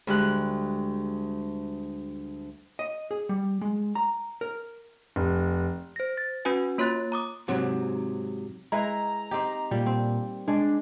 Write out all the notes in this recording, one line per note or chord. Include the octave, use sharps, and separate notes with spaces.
D2 G3 G#3 F#6
D#5
G#4
G3
G#3
A#5
A#4
F1
C5 A#6
A6
C#4 F#4 B4 G#5
A#3 F4 C#5 C6 F#6 A6
A#5 D6 D#6
G#2 C3 F#3
G#3 E4 B4 A#5
C4 D#4 G4
A#2 G3 A#3
C4
G#3 D4 D5